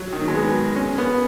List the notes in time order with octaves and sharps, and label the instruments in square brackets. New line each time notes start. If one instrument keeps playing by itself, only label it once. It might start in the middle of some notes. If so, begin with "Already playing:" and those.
Already playing: [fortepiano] F#3
D#3
F#3
G#3
B3
C#4
B3